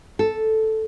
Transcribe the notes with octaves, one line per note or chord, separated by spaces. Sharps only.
A4